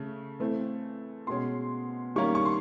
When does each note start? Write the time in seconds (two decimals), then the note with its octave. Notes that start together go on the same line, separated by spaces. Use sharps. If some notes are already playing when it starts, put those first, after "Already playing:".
Already playing: C#3 A3
0.39 E3 A3 C4
1.27 B2 G#3 C#4 C6
2.16 D#3 G3 A#3 C#4 C#6
2.35 C#6
2.45 C6